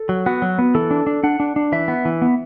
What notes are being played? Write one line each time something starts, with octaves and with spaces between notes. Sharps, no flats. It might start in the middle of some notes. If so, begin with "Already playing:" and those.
Already playing: A4
F#3
B3 F#4
F#3
B3
E3 A4
D4
D4
D4 F#5
D4
D4
E3 E5
B3
E3
B3